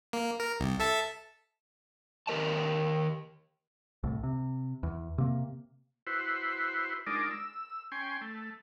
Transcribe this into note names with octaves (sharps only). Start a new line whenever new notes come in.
A#3
A#4
C2
A4 E5 A5
D#3 G4 A#4 D#5 A5
C2 A2
C3
E2
C3 A#3
E4 F#4 B4 C5
G#3 D4 D#4 F4 A#4 D5
E6
C#4 G5 G#5 C6
A3